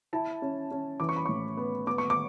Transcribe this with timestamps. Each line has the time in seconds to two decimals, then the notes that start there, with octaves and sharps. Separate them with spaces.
0.13 E4 A5
0.42 C#4
0.71 C#4
1.00 E3 D6
1.09 C#6
1.16 B5
1.25 A2 C#6
1.57 B3
1.87 B3 D6
1.98 C#6
2.10 D6